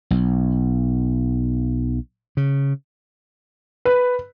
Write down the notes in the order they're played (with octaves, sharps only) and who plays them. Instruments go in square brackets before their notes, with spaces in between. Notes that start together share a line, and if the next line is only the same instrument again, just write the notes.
[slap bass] B1
C#3
[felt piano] B4